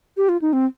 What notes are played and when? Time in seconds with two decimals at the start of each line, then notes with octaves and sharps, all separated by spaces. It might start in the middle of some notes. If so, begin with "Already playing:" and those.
0.17 G4
0.29 F4
0.42 D#4
0.53 C4